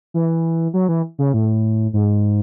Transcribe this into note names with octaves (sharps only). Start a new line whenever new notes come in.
E3
F#3
E3
C#3
A2
G#2